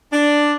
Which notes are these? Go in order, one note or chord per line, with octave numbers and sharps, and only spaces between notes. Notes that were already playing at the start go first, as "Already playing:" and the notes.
D4